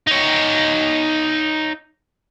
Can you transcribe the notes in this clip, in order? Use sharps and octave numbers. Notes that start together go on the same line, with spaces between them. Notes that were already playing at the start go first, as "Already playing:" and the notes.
D#4 C#5